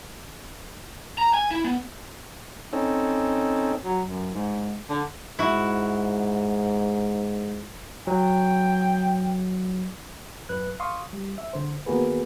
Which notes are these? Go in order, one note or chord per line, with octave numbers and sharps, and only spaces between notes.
A#5
G#5
E4
B3
C4 C#4 D#4 A4
F#3
F#2
G#2
D3
G#2 E4 F#4
F#3 G5
F#2 B4 F#6
F5 C6 C#6 D#6
G3
E5
D3 C5
D#3 A#3 B3 F#4 G#4 B4